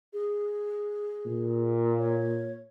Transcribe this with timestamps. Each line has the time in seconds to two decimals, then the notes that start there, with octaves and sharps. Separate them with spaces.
0.13 G#4
1.26 A#2
1.99 C#5